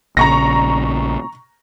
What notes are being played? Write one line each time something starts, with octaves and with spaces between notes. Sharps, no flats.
A#1 C#3 A#5 C#6 A#6